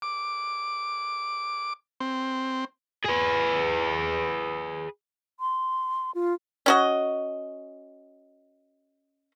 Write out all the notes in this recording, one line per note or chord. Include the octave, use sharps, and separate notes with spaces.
D6
C4
G#4 B4
C6
F4
C#4 F#4 D#5